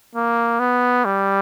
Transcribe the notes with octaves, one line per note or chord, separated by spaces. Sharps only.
A#3
B3
G3